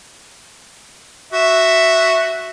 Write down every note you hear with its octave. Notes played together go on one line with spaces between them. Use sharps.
F#4 E5